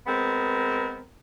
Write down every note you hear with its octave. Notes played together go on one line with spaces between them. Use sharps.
G#3 B3 C4 A#4